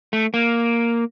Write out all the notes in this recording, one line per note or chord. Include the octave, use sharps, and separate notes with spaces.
A3
A#3